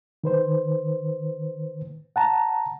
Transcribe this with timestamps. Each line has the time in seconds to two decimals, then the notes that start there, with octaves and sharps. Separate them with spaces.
0.24 D#3 B4 C5
2.16 F#5 A5 A#5